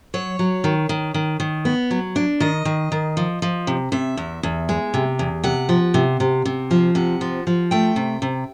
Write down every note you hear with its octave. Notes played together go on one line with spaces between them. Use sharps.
F#3 C#5
F#3
D#3
D#3
D#3
D#3
B3
F#3
D4
D#3 D#5
D#3
D#3
F3
F3
C3
C3 E5
E2
E2
G#3
C3
E2
C3 F#5
F3
C3
C3
C3
F3
C3 F#5
F3
F3
A3 G5
C3
C3